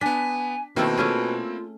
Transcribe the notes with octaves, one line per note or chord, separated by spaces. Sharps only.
B3 D4 G#5 B6
B2 D#3 A3 A#3 C4 E4
A3 C#4 F4 G#4